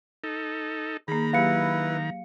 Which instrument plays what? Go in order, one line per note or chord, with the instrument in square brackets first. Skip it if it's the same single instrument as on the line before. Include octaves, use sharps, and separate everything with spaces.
[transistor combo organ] D#4 A4
[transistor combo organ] D#3 A#5 [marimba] A#3 G#4 [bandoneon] B5
[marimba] F#3 A#3 G4 [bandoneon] E4 B4 [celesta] F5 C#7